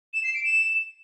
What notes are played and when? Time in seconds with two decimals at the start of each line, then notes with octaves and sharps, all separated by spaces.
0.14 E7
0.24 C7
0.34 D7
0.44 E7